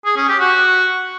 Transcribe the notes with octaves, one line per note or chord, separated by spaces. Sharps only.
G#4
C#4
G4
F#4